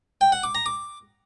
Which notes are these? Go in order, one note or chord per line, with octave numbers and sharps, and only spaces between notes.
G5
F#5
D6
A#5
D6